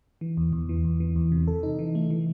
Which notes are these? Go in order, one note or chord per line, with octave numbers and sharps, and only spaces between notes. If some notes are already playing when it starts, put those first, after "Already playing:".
E3
E2
E2
E3
E2
E3
E2
C3
A4
D#4
E3
A3
E3